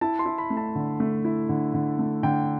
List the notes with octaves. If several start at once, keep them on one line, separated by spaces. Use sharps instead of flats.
E4 A5
C6
E4
B5
A3
A5
D3
A3
E4
D3
D3
A3
D3 G5